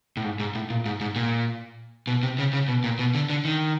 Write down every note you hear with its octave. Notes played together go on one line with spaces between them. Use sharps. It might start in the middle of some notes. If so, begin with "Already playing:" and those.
A2
G#2
G#2
A2
A#2
G#2
G#2
A#2
B2
C3
C#3
C#3
B2
A#2
B2
D3
D3
D#3